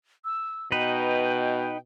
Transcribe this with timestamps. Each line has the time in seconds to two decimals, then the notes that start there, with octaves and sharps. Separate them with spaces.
0.25 E6
0.72 B2 D#4 B4 G5